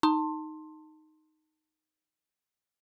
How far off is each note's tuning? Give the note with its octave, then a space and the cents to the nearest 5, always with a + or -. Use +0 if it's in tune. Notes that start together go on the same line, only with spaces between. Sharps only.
D#4 +0 A5 +25 C6 +15